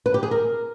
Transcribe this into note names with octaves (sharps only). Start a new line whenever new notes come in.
B4
G4
G#4
A#4